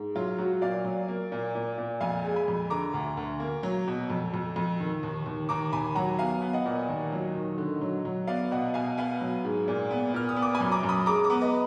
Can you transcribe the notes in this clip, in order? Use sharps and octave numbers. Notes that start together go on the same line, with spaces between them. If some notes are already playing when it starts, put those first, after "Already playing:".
Already playing: G#2
F#3 F4
F#3 F#4
A#2 D5 F5
F#3
A#3
A#2
A#2
A#2
F2 F5 G#5
G#3
G#5 B5
F2
D3 A#5 D6
D2
D2
A#3
F#3
B2
F2
F2
F2
D#3
D#2
D#2
D#2 A#5 D6
D#2 G#5 B5
F#3 F#5 A#5
B3 F5 G#5
B3
D#5 F#5
A#2
D#2
F#3
D#3
D3
F#3
F#3
B3 D5 F5
B2 D#5 F#5
B2 F5 G#5
B3 F5 G#5
F#3
G#2
A#2
B3
A#2 F6
D#6
B3
D6
G#5 B5
F#2
A#5 D6
F#2
B5 D#6
G#3 A#5 D6
A#5 D6
B3
B4 D#5